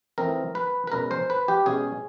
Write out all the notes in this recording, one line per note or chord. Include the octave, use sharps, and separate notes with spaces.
E3 A3 C4 D#4 A#4
B4
B4
B2 G#3 C#4 A#4
C5
B4
G4
B2 G#3 C#4 G#4